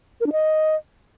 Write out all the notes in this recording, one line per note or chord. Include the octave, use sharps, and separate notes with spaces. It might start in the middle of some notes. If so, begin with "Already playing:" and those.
A#4
D4
D#5